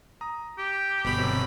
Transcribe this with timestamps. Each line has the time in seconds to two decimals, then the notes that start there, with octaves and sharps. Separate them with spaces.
0.21 A#5 D#6
0.58 G4
1.05 G1 B2 B5
1.18 C3 F#3 C4